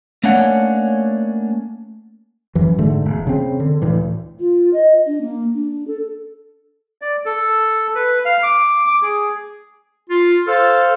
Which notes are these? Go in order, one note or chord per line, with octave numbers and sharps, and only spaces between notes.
A3 A#3 C#4 D4 C#5 F#5
F#2 E3
G#2 D3 A3
E1
C#3 C4
D3
D2 A2 E3
F4
D#5
D4
A#3
D4
A4
D5
A4
B4
F5
D6
D6
G#4
F4
A4 C5 F5